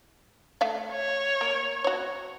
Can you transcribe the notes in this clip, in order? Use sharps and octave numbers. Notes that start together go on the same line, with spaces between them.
A3 E5 F5
C#5
A#3
F#4 C#5